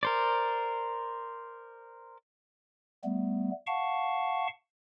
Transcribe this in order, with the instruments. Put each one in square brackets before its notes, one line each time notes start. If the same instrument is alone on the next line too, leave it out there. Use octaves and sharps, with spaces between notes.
[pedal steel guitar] A#4 C5 D5
[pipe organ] G3 A3 B3
F5 F#5 A5 C#6